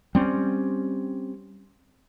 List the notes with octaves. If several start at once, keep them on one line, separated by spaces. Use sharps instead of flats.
G3 C4 C#4